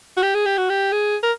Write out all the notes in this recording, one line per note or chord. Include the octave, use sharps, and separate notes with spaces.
F#4
G4
G#4
G4
F#4
G4
G#4
A#4